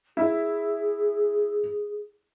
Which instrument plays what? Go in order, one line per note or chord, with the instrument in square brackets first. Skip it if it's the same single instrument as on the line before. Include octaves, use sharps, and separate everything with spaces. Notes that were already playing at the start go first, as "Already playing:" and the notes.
[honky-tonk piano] E4 [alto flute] G#4